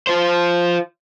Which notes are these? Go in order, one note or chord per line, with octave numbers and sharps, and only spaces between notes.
F4 C5